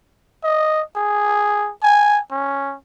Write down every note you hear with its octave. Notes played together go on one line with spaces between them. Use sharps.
D#5
G#4
G#5
C#4